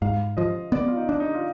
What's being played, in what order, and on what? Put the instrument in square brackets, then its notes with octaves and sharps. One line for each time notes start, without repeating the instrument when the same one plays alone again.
[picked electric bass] G#2 [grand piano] F5
[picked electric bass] F3 [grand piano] D#5
[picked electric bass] B3 [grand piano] D5
[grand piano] F4
D#4
[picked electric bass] D4
[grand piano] D#4
F4